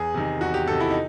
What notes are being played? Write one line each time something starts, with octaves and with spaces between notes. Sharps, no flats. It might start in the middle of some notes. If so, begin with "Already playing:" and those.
Already playing: E2 G#4
C3 D#3
E2 F#4
G4
C3 D#3 A4
E4
D#4